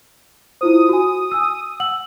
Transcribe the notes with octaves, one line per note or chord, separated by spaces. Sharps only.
E4 F4 C5 D#6
F#4 G#5
G#5 E6
F#5 E6 F#7